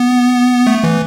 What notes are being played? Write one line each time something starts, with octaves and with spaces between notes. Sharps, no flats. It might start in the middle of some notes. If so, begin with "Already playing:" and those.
Already playing: B3
A3
E3